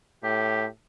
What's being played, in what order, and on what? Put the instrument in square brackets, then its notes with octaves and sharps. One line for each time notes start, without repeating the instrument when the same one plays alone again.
[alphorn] A2 [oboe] G4